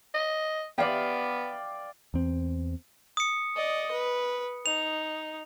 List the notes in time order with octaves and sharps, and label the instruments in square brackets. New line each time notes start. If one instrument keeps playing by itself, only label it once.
[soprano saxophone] D#5
[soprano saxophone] B3 [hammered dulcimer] D5 F5 G5
[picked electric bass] E2 C4
[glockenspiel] D#6 C#7
[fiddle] D5 D#5
B4
[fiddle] D#4 [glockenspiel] F7